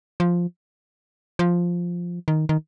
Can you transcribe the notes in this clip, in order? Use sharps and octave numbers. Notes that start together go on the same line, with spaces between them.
F3
F3
D#3
D#3